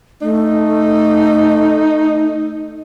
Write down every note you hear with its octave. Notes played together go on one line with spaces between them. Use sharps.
A3 D#4